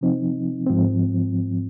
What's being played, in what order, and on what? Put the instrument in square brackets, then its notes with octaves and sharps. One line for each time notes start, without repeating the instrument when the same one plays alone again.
[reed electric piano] C3 F3 C4 D#4
G#2 F3 C4